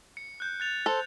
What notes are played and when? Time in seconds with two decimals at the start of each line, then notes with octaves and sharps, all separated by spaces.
0.17 C#7
0.40 F#6 G6
0.60 F#6 A6 F7
0.86 A4 C5